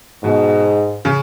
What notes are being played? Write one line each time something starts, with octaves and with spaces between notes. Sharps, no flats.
G#2 B2
C#3